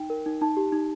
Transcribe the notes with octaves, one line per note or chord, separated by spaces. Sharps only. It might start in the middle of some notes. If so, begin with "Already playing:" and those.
Already playing: D#4 G5
A#4
D#4
D#4 A5
G4
D#4